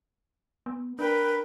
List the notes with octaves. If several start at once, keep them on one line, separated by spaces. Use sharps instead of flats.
B3
D4 A#4 B4 G5